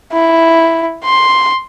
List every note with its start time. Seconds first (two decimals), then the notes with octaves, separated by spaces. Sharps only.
0.13 E4
1.04 C6